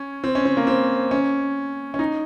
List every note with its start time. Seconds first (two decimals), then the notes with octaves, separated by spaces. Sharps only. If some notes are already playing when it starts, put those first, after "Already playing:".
Already playing: C#4
0.24 C4
0.35 C#4
0.45 C4
0.57 A#3
0.67 C4
1.11 C#4
1.94 C#4
1.99 D#4